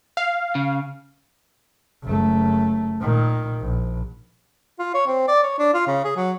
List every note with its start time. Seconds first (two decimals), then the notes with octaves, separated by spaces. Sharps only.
0.17 F5
0.55 C#3
2.04 F#1 A3
3.01 A#2 D#3
3.61 A#1
4.80 F4
4.94 C#5
5.07 C4
5.28 D5
5.43 C#5
5.58 D4
5.74 F4
5.87 C#3
6.05 G#4
6.17 F#3